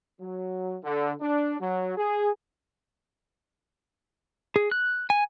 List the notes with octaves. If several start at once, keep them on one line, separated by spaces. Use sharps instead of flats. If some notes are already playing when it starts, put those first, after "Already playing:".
F#3
D3
D4
F#3
G#4
G#4
F#6
G#5